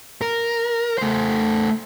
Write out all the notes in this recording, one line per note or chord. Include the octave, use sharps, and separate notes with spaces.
A#4
A3 C5